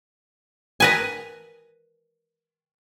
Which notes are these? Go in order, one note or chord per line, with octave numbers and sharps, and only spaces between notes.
A#4 B4 G#5